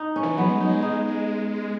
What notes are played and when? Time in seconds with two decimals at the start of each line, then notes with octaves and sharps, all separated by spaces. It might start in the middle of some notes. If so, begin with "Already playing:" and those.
Already playing: D#4
0.16 C#4
0.23 E3
0.38 F#3 B3
0.49 G#3
0.60 F#3 D#4
0.72 G#3
0.82 D#4